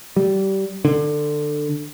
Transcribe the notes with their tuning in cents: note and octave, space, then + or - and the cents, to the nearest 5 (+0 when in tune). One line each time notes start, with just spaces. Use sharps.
G3 -25
D3 +15